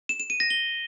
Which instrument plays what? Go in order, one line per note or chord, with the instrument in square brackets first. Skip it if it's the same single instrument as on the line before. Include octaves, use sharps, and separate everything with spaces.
[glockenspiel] E7
E7
D#7
A#6
G7